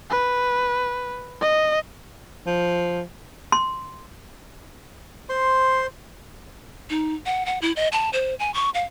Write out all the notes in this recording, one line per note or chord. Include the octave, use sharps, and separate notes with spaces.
B4
D#5
F3
C6
C5 C6
D#4
F#5
F#5
E4
D#5
A5
C5
G#5
C#6
F5